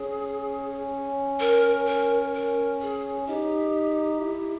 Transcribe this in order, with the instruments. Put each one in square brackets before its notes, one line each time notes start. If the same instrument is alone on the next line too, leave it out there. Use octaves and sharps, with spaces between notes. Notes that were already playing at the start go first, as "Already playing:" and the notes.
Already playing: [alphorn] C#4 [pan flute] G#4
[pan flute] A#4
A#4
A#4
G#4
[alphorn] D#4 [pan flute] G4
[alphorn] E4